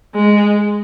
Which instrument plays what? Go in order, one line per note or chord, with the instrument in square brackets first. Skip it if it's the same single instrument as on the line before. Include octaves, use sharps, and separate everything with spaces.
[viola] G#3